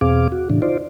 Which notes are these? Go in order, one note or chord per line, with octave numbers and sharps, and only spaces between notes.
E2 B2 C4 G#4 F5 D6
F#4
A2 C#3 E3 D4
D#4 F4 C5 D5